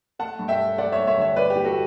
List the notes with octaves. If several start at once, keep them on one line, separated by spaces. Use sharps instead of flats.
A3 F#5 A5
G2
E5 G5
A3
A3 D5 F#5
C#5 E5
G2
C#5 E5
D3
C#5 E5
G2 B4 D5
G4
E3
F#4 A4